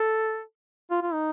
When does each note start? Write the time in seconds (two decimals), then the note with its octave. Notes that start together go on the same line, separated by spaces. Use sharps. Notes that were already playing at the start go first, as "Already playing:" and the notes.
Already playing: A4
0.91 F4
1.03 F4
1.14 D#4